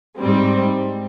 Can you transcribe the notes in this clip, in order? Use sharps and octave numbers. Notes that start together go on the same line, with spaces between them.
G#2 G3 C4